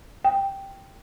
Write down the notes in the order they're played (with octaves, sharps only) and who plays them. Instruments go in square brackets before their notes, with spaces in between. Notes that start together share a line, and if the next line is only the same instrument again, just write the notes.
[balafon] G5